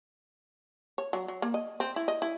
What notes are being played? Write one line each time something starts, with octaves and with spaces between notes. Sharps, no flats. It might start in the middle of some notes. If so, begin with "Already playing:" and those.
C#5
F#3
F#3
A#3
D#5
C4
E4
D#5
E4